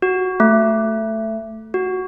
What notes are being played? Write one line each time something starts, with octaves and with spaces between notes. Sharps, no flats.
F#4
A3
F#4